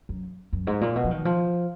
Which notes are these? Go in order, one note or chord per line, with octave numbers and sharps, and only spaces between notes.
F#2
F#2
G#2
A#2
B2
F3
D#3
F3